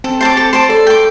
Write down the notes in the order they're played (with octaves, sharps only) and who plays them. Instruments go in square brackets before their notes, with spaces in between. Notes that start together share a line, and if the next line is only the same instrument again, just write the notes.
[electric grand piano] C4 [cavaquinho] A4
[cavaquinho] C5 A5 D6
A4
C5 A5 D6
[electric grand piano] A4 [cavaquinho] D5
[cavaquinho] G5 D6